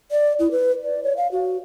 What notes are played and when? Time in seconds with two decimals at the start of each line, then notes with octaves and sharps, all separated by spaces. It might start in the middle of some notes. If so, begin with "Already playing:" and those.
0.11 D5
0.39 E4
0.51 B4
0.84 D5
1.03 C#5
1.17 F5
1.32 F#4